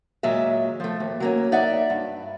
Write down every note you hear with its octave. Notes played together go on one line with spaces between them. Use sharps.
D#2 A#2 F#3 G#3 E5
F3 A3
D#2
F#3 A#3 C#4
D#4 D5 E5 F#5
G2